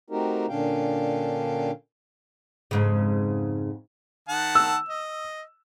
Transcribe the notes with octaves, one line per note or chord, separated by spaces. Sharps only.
A3 C4 D#4 F#4 G4 A#4
A#2 D3 C#4 D4 F5 G5
F2 G#2 C#3
D#3 F#5 A5
E6
D#5